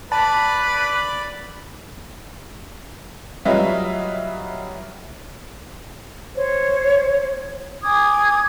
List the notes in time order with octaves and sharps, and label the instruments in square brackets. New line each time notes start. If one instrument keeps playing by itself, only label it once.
[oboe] B4 [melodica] D5 B5 [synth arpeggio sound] A5
[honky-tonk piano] F#3 G3 F4 B4 D#5 E5
[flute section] C5 C#5
G#5 D6 D#6 G#6